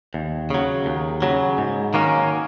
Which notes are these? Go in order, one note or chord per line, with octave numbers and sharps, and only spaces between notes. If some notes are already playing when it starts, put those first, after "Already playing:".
D#2
C#3 F#3
D#2
C#3 F#3
G#2
D#3 F#3 A#3 C#4